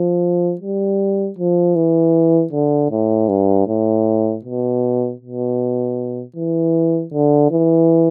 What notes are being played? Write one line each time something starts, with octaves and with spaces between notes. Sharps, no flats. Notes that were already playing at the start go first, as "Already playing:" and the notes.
Already playing: F3
G3
F3
E3
D3
A2
G2
A2
B2
B2
E3
D3
E3